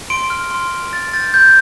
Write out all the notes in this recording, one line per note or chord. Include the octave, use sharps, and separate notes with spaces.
C6 D7
F6
C6
F6
C6 A6
G6 A6
C6 G6